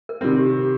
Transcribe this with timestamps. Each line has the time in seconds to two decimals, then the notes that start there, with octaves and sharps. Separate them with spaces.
0.09 A#4
0.21 C3 D#3 G3 C4 A#4
0.39 G4
0.57 G4